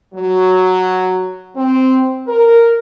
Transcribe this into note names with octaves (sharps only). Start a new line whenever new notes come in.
F#3
C4
A#4